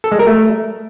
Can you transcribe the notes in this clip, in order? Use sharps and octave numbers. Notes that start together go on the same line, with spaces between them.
A4
G#3
A#4
A3